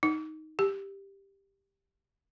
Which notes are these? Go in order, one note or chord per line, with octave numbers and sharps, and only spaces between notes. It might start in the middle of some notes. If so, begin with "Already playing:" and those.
D#4
G4